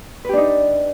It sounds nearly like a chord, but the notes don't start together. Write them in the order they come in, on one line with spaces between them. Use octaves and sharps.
B4 G4 D4 D#4